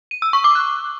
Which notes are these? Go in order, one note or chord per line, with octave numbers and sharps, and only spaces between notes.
D#7
E6
C#6
D6
F#6